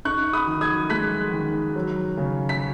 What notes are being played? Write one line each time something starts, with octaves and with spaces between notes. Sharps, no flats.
D#4 C#6 F#6
B5 D#6
D#3
D#6 G#6
G#3 F#6 B6
D#3
F#3
C#3
B6